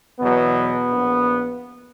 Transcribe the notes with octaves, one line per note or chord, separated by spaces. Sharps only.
E2 B2 F#3 B3
A#1